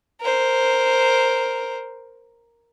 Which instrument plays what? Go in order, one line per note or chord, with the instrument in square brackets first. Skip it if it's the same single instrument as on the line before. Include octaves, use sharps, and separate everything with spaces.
[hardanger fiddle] A#4 C5